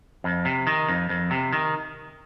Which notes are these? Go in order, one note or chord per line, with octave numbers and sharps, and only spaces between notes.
F2
C3
D#3
F2
F2
C3
D#3